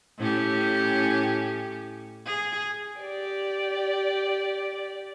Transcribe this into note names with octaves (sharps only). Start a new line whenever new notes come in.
A2 C#4 G4
G#4
G4 D5